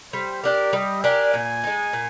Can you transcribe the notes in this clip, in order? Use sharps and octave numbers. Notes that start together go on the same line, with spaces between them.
G3 C5
D4 G4 A#4 D5
G3 D#5
D4 G4 A#4 G#5
A#2
G#3 D#4
A#2